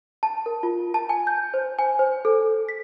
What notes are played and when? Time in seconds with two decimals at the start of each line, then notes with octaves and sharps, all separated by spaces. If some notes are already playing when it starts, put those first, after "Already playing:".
0.23 A5
0.46 A#4
0.63 F4
0.94 A5
1.09 G#5
1.27 G6
1.54 C5
1.79 G#5
1.99 C5
2.25 A4
2.69 B6